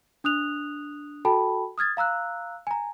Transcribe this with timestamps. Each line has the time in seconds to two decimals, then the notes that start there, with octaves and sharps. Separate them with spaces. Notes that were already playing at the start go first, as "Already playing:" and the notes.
0.24 D4 D#6 F#6 F7
1.25 F#4 A4 G5 A5 B5
1.78 D#6 F6 G#6 A6
1.97 F5 A#5 E6 F#6
2.67 G#5 A#5